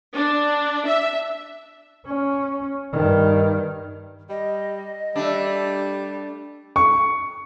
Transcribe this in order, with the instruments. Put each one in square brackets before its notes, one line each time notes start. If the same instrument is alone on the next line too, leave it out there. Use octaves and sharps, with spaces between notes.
[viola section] D4
E5
[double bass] C#4
G2 D#3
[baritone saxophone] G3 [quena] D#5
[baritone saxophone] G3 [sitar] A3 D4
[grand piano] C#6